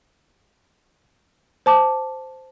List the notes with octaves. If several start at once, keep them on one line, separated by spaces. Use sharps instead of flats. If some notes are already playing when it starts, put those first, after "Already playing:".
C5 A5 D6